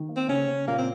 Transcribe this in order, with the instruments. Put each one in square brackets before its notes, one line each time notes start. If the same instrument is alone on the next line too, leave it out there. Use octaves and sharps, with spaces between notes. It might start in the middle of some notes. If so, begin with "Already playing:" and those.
Already playing: [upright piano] D#3
A#3
[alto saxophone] C4
[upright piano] C#3 [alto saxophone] C#4
[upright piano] C#3
[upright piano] A#2 [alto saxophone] A#3
[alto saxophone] C4